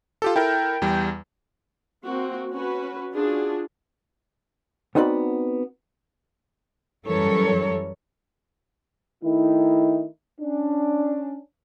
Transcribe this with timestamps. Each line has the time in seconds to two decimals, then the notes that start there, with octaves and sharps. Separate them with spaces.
0.22 F4 G4 A4
0.36 E4 A4 A#4 G5
0.82 E2 G3
2.05 A#3 C4 F#4
2.52 C#4 F#4 B4
3.14 D4 F4 F#4 G#4
4.95 B3 C4 D#4 F#4 D5 B5
7.07 F#2 E3 G3 A4 A#4 C#5
9.24 D#3 A3 D#4 E4
10.41 C#4 D4